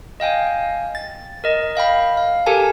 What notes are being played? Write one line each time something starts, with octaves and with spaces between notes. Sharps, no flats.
D#5 F5 G5 G#5
A6
A#4 D#5
D#5 F5 G5 B5
F5
G4 A4 A#4 G#5 A5